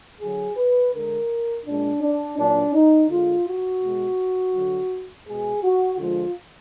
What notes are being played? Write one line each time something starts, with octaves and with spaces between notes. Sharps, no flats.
D3 F#3 G#4
B4
D3 G#3 A#4
A#2 G#3 D4
D4
A#2 F#3 D4
D#4
D3 G#3 F4
F#4
B2 G#3
D3 F#3
B2 G#3 G#4
F#4
D3 F3 G#3 F4